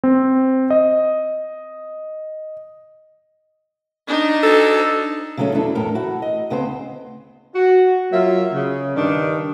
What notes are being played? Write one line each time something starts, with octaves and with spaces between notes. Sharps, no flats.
C4
D#5
D4 D#4
A4
C#3 F#3 A3 B3 C#4
E2 F#3 D4 E4 A4
E2 A2 A4 A#4
E4 F#4
D#5
D2 C#3 B3 C4 C5
F#4
F#3 A#3 F4 E5
C#3
G2 D#3 D4